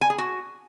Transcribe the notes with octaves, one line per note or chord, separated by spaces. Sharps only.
G#5
G#4
F#4